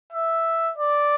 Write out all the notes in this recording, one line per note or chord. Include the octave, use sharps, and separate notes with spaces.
E5
D5